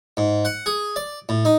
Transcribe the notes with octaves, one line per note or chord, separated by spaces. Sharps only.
G#2
F#5
G#4
D5
A2
D#4